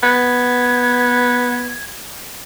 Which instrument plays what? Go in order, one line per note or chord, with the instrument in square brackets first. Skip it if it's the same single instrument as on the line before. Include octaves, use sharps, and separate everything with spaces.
[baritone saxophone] B3 [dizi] G#6